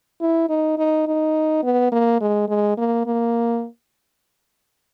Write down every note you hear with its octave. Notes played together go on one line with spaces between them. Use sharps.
E4
D#4
D#4
D#4
B3
A#3
G#3
G#3
A#3
A#3